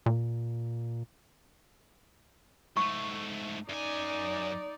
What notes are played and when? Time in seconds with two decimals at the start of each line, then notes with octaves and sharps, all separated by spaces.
0.06 A#2
2.77 G#2 A3 C#6
3.69 F#2 D#4 D5 G#5